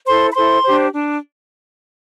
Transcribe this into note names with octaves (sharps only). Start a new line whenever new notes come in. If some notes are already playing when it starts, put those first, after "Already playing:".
E4 A4 C5 C6
B5
E4 A4 C5 C6
D4 G4 C5
D4